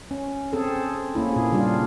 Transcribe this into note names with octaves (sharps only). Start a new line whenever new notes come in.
C#4
C4 G#4 A4
A#3 C#4 E4
A#2 G#4
C#3 G3 D4 F4